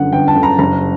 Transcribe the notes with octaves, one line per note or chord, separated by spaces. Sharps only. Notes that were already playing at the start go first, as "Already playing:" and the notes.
Already playing: G1 F#2 D3 F#5
G1 G5
A5
F#2 D3
A#5
F#1 A#5